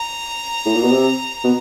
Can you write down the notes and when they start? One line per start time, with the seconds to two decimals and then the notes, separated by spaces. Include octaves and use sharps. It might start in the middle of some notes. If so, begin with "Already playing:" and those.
Already playing: A#5
0.66 A2
0.75 A#2
0.84 B2
0.91 C3
1.44 B2